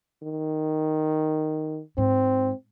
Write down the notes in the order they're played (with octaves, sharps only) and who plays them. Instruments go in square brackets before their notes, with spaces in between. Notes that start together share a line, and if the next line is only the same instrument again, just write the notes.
[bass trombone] D#3
[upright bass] G#2 [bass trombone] C4